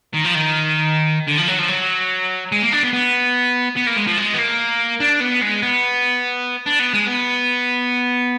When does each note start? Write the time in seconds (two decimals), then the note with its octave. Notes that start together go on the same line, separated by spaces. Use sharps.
0.14 D#3
0.25 F3
0.35 D#3
1.28 D3
1.38 F3
1.48 F#3
1.59 F3
1.69 F#3
2.52 G#3
2.62 A#3
2.72 D4
2.83 B3
2.93 B3
3.76 B3
3.86 A#3
3.97 G#3
4.07 F3
4.17 G#3
4.34 B3
4.39 A#3
5.00 D4
5.20 B3
5.42 G#3
5.62 B3
6.66 D4
6.79 B3
6.93 G#3
7.07 B3